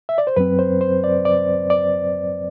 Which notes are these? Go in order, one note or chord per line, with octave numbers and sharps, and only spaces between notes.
E5
D5
C5
F#2 F#3 C4 B4
C5
C5
D5
D5
D5